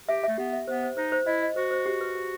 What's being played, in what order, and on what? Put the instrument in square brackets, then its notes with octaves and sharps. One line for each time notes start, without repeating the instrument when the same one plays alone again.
[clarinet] G4 [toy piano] E5
[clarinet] A3 [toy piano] E5
[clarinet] B3 [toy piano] G4
[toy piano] E5
[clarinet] B3 [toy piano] C5
[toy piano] C5
[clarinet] D#4 [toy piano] C5
[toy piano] C5
[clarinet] E4 [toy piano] D#5
[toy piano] D#5
[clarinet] F#4 [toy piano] C5
[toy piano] C5
G4
B4
B4